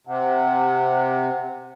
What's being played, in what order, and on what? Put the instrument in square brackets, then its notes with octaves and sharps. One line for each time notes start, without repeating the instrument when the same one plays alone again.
[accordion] C3 [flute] F#5